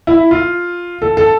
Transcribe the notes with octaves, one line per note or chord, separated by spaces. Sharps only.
E4
F4
A4
A4